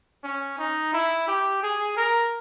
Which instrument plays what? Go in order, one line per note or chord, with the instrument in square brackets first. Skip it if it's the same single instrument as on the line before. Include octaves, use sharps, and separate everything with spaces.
[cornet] C#4
D#4
E4
G4
G#4
A#4